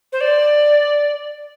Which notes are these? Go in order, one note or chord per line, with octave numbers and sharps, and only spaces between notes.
C5
D5